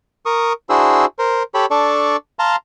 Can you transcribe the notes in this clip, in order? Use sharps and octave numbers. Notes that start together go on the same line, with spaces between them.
A#4 C#6 D#6
D4 E4 F#4 G#4 C5 E6
A#4 C5
G4 A4 C#5 B5
D4 A4 D5 C#6
F5 A5 A#5 C6